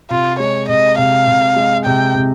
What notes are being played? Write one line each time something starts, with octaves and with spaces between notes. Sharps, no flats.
C3 F4
G#3 C#5
C3 D#5
C3 F5
C3
G#3
C3 G5
C3